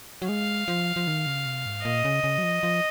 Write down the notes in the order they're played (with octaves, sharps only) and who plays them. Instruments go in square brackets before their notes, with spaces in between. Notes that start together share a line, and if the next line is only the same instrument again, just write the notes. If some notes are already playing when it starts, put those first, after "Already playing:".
[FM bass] F#3
[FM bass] G#3 [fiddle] F5
[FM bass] F3
F3
D#3
C#3
C3
G#2
[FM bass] A#2 [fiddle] D#5
[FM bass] C#3
C#3
F#3
F3
F3